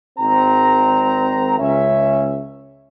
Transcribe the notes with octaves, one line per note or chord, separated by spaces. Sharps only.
G#1 C4 A#5
C#2 C#4 E5